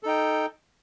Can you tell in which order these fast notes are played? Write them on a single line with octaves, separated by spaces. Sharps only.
A4 D#4 G5